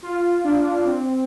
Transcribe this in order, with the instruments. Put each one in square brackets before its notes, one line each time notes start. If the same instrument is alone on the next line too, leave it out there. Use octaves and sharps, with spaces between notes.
[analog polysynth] F4
D4
C4